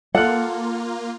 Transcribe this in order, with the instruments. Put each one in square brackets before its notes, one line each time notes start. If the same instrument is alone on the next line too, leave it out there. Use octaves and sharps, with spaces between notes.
[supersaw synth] A#3 F4 [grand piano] A4 F5 F#6 [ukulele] F#5